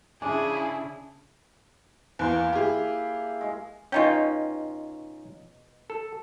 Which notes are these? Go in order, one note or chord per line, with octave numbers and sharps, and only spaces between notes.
C#3 D4 E4 G#4 G#5
E2 A#3 C6
E4 G4 G#4
G#3
B2 G#3 C#4 D#4 F4 G5
A4